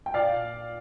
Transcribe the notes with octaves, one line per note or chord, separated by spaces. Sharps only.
G5
A#2 D5 F5